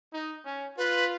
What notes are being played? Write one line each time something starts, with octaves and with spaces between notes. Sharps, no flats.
D#4
C#4
F4 B4